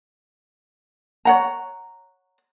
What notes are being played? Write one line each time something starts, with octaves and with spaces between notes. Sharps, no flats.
C#5 F#5 A#5